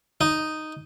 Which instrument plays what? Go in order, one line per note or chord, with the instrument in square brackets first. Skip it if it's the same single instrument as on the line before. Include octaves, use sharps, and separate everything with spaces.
[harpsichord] D#4